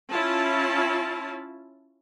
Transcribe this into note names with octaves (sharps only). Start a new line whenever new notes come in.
C#4 E4 F4 A5